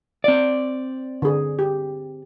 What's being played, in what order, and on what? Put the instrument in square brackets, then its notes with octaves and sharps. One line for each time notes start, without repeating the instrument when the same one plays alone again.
[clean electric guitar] C4 D5
[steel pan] D3 G#4
G4